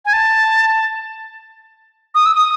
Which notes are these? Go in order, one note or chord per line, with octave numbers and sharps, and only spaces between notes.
G#5
A5
D#6
E6
D#6